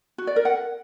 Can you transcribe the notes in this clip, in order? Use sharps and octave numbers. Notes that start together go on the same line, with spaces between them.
F#4
D5
A#4
F#5